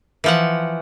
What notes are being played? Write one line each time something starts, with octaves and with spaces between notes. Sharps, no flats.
E3 F3 F#5